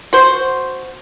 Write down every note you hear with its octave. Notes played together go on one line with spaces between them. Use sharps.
F#4 C5